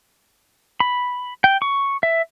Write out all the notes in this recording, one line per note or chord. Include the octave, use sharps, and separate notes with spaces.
B5
G5
C#6
E5